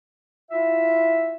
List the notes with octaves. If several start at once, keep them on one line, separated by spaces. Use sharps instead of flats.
E4 F4 E5